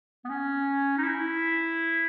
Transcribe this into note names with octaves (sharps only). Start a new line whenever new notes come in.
B3
C#4
D#4
E4